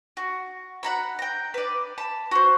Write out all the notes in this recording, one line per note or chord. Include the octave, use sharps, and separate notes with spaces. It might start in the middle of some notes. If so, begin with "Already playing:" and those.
F#4
F#5 A#5 B5
G5 A#5
B4 D5
A5 B5
F#4 C5